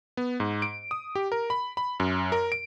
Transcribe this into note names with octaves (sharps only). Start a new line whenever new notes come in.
B3
G#2
D7
D#6
G4
A#4
B5
B5
F#2
A#4
D7